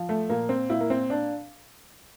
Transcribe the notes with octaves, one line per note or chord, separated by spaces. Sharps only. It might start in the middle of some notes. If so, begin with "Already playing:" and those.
Already playing: F3
A3
A#2 A#3
C4
A#2 E4
A#3
C4
D4